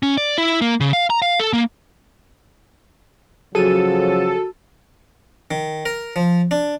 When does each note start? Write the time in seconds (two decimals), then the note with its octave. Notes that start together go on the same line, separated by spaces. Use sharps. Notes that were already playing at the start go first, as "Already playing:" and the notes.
0.03 C#4
0.18 D5
0.38 E4
0.61 A#3
0.80 C#3
0.93 F5
1.10 A#5
1.22 F5
1.40 A4
1.53 A#3
3.55 C#3 F3 F#3 F#4 G#4 A4 D#7
5.51 D#3
5.86 A#4
6.16 F3
6.51 D4